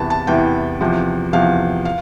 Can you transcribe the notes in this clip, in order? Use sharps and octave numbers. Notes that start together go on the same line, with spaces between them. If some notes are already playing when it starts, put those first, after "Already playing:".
Already playing: E2 C3 E3 A5 B5
A5
E2 C3 E3 G5
E2 C3 F3
E2 C3 F3 F5
F5